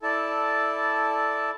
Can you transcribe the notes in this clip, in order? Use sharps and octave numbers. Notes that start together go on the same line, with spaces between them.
E4 A4 D5 A5